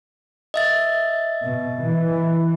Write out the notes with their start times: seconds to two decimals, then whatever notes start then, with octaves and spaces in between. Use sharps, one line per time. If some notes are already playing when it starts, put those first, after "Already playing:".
0.54 D#5 E5 A6
1.44 B2
1.83 E3